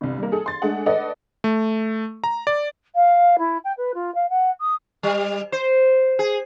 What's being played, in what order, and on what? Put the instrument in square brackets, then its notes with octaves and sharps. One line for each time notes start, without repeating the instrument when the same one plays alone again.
[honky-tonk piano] G1 C2
G3 A#3
G#4 A4
C6 A6
G#3 A3 D4 G#4 F#5
A4 B4 D5 D#5 F#5
[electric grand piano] A3
A#5
D5
[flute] F5
E4
G5
B4
F4
F5
F#5
D#6
[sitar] G3
C5
G#4